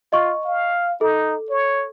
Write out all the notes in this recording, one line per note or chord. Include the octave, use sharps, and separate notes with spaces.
F4 D#5 C#6
F5
D#4 A4
C#5